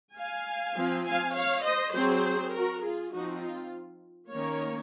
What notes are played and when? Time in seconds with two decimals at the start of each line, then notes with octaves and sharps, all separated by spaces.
0.15 F5 G#5
0.75 F3 C4
1.04 F5 G#5
1.35 C#5 F5
1.64 C5 D#5
1.94 F#3 C4 G#4 C5
2.53 F#4 A#4
2.83 F4 G#4
3.13 F3 C4 D#4 F#4
3.42 F4
4.32 D#3 A#3 C#4 A#4 C#5